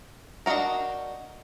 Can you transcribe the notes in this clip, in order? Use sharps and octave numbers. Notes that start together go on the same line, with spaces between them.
D4 D#4 F4 F#4 A#4